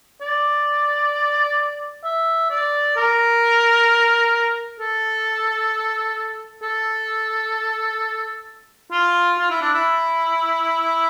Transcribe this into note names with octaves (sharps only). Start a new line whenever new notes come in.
D5
E5
D5
A#4
A4
A4
F4
F4
E4
D4
E4